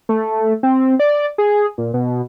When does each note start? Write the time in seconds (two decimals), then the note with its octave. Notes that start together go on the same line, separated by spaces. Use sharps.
0.09 A3
0.63 C4
0.99 D5
1.38 G#4
1.78 A#2
1.94 B2